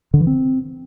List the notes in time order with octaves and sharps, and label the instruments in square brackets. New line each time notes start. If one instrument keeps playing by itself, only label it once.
[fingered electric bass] D3
E3
C4